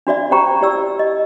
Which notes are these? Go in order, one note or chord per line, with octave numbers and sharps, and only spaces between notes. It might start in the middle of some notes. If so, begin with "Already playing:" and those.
D4 F#4 D5 E5
C#4 G4 C5 G5 A#5 C#6
E4 G4 D5 E6
D#5